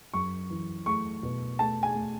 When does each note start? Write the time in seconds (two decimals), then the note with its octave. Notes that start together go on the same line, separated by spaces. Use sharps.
0.14 F#2 C#6
0.50 E3
0.86 A3 C#6
1.23 B2
1.59 A3 A5
1.83 G#5
1.95 A3